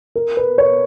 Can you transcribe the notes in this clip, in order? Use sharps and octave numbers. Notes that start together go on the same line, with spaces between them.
A#4
B4
C#5